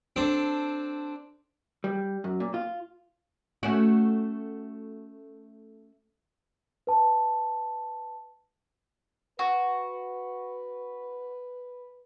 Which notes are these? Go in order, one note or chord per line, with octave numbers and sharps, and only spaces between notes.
C4 D4 A4 C5
G3
F#2
A#2
F4
A3 C#4 F#4
B4 A5
F#4 B4